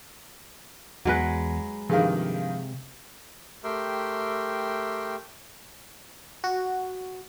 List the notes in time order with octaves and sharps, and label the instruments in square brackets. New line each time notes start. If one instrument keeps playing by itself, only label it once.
[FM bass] E2 [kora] F#3 G#3 B4
[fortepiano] G2 D#3 [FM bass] C3 [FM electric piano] F3 G#4 F5
[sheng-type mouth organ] A3 G4 A#4 E5 G5 C6
[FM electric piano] F#4